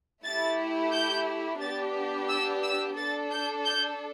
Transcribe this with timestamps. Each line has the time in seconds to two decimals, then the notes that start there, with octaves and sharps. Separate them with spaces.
0.24 A3 E4 G4 A6
0.92 G6
1.60 B3 D4 G4 A6
2.29 E6
2.63 E6
2.97 D4 A4 A6
3.31 G6
3.65 G6